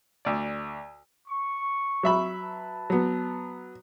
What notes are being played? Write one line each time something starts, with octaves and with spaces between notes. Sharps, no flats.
D2 D5
C#6
F#3 E5 B5
B4 A5
F#3 B3